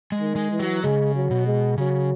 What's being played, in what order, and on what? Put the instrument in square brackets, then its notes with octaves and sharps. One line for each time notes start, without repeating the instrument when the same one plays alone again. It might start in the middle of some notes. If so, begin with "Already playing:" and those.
[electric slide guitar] G#3
[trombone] D#3
[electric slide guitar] G#3
[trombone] E3
[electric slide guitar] F#3
[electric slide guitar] C#3 [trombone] G#3
[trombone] F#3
[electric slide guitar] B2
[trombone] G#3
[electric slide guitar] C#3 [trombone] F#3